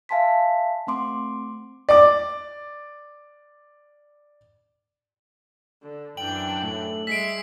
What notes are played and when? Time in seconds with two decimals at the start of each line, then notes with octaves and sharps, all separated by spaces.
0.09 E5 F5 G#5 A5 C6 B6
0.87 A3 C4 C6 D6
1.89 D5 D6
5.81 D3
6.17 F#2 E3 D4 G5 F#7
6.63 A2
7.07 G3 G#3 E5 B6 C7 D7